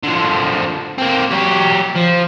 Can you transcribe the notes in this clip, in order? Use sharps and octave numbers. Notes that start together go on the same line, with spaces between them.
D3 F3
A#3 C4
F#3 G4
F3